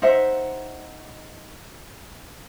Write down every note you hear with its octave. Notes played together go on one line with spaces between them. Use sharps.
D#4 C5 E5 F#5